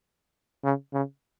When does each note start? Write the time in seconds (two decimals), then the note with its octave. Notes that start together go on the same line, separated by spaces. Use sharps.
0.64 C#3
0.93 C#3